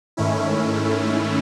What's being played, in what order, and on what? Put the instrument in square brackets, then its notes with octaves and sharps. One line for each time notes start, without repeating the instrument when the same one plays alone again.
[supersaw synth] G#2 D#3 A3 C#4 E4